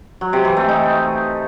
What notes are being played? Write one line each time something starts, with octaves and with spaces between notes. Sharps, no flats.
F#3
C3
E3
A3
D#4